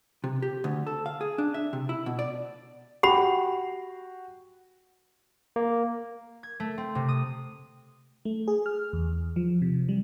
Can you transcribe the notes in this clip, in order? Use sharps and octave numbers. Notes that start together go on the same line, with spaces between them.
C3
G4
D2
A4
F5
G#4
D4
E5
C3
E4
B2
D5
F#4 G4 G5 B5
A#3
G#6
A3
C4
C3
D#6
A3
G#4
F6
E2
F3
C3
G3